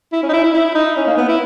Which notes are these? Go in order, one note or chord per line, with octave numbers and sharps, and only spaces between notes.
E4
C#4
D#4
E4
E4
E4
D#4
C#4
A#3
B3
E4